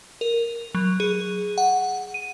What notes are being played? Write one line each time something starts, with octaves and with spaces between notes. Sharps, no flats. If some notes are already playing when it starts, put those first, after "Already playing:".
A#4
F#3
G#4
F#5
D#7